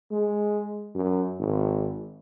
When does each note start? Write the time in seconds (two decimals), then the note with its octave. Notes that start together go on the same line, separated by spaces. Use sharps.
0.12 G#3
0.95 F#2
1.39 G#1